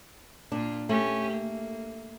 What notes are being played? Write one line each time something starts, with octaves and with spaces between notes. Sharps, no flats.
A#2 A#3 D4 F4
A3 C#4 G4
A#3